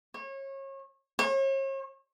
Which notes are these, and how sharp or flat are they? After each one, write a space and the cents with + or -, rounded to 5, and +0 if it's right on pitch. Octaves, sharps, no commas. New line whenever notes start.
C#5 -30
C#5 -40